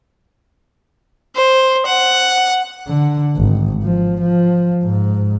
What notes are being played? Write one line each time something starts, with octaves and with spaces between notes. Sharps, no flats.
C5
F#5
D3
G#1
F3
F3
G#2